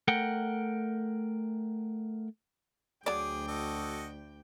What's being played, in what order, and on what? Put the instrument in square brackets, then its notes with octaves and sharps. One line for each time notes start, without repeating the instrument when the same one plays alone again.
[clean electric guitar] A3 A#4 F#5 G5
[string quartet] D2 G5 [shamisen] F#3 D5 [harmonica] G#4 [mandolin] D6
[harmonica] F#4 A4 D#5